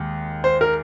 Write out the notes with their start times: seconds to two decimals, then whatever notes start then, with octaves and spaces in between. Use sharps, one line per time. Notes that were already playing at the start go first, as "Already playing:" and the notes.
Already playing: D#2 G#3
0.44 C5
0.61 A#4